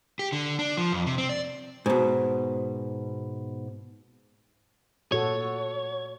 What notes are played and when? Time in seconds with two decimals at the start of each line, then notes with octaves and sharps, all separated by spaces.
0.19 G4
0.32 D3
0.59 D4
0.77 F3
0.92 F2
1.06 C3
1.18 C4
1.29 D5
1.86 G#2 B2
5.12 A#2 F#4 A4 C#5